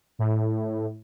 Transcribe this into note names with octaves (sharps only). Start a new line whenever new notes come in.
A2